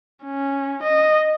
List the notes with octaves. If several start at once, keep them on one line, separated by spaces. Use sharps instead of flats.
C#4
D#5